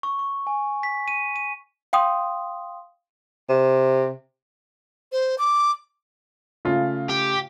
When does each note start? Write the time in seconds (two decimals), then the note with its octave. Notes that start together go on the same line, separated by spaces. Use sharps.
0.03 C#6
0.19 C#6
0.47 G#5
0.83 B6
1.08 D#7
1.36 D#7
1.93 F5 G5 C6 D#6
3.49 C3
5.12 C5
5.38 D6
6.65 C#3 A3 F4
7.10 G4